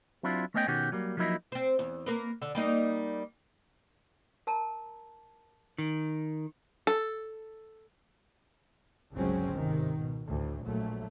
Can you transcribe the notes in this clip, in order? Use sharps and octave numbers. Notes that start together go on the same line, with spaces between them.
F#3 C4 D4 E4 F4
A3 B3 C#4 D#5 E5 G5
B2 D#3 C#4 F#4 G4
F#3 G3 A#3
F3 F#3 A#3 D#4 E4 D#5
C4 C5
E2
A#3 A#4 B4
D3
G3 A#3 D#4
A#4 A5 A#5
D#3
A4
G1 C#2 F#3 G#3 C4 C#4
G#2 C3 D#3
B2
D2 A2
A#1 A#2 F#3 A3